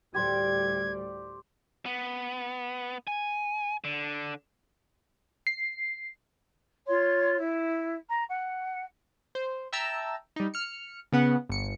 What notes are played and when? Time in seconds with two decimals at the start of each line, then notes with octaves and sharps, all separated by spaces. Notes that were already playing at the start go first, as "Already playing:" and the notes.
0.14 D2 A2 G3 G4 C5 D5 G#6
1.86 B3
3.07 G#5
3.84 D3
5.47 C7
6.88 F4 C#5 C6
7.37 E4
8.07 A#5
8.28 F#5
9.35 C5
9.73 E5 G5 A5 A#5 E6
10.36 G3 D#4
10.54 F6 C#7
11.12 C#3 B3 F#5
11.49 G1 C#7